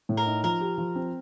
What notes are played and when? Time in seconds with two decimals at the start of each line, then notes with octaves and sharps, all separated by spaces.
0.09 A2
0.17 A#4
0.26 D#4
0.44 F3 A#4
0.61 G4
0.78 F3
0.95 C4